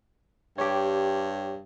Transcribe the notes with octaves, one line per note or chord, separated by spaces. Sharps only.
G2 G4 C#5